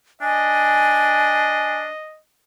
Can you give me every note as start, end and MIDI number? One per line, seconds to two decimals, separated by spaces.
0.22 1.88 62
0.22 2.20 75
0.22 1.77 80